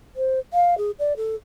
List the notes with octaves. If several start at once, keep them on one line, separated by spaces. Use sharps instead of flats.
C5
F5
G#4
D5
A4